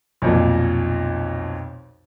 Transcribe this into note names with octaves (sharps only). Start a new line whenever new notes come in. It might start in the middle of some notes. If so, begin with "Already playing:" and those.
B1 F2 A#2